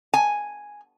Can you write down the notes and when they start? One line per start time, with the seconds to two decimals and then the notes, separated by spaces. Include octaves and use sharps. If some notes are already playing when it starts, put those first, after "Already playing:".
0.14 G#5